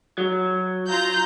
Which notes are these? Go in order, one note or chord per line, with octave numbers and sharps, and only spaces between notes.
F#3
F4 A#5 G6